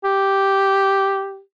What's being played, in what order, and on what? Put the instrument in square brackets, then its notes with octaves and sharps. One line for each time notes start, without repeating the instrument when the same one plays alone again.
[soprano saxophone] G4